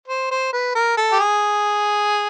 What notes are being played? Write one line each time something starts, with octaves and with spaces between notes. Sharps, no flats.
C5
C5
B4
A#4
A4
G4
G#4